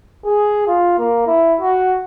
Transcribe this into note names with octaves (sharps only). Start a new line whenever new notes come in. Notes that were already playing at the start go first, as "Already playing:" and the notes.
G#4
F4
A#3
E4
F#4